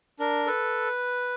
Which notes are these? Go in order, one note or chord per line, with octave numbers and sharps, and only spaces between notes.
D4 A#4
A4 B4